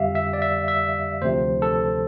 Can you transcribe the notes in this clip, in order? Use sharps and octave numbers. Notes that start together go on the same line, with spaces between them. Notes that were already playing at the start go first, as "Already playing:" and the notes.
Already playing: F2 D3 G3 G4 E5 F5
E5
D5
E5
E5
D2 C3 F3 C5
A4